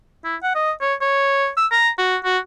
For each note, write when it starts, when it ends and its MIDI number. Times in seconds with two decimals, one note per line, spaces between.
0.25 0.36 64
0.43 0.51 78
0.56 0.71 75
0.81 0.94 73
1.01 1.49 73
1.57 1.66 88
1.72 1.89 82
1.98 2.17 66
2.24 2.38 66